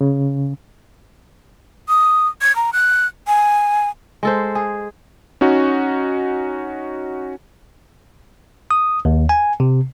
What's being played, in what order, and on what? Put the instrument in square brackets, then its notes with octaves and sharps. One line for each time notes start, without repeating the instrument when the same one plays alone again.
[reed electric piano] C#3
[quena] D#6
G#6
A#5
F#6
G#5
[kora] G#3 A4 C5
G#4
[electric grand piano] C#4 D#4 F#4
[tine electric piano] D#6
D#2
G#5
C3